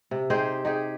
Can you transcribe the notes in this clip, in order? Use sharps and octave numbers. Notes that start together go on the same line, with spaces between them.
C3
D#4 G4 G#4 C5
D#4 G4 G#4